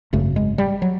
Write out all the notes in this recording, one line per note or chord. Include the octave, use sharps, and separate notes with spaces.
G#1 F#2 C#3 A3
G#3
G3
F#3